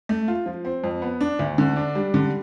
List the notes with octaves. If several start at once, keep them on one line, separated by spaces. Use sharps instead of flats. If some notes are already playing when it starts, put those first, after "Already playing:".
A3
F4
F3
C4
F2
B3
D4
D2
D3
D4
G3
D3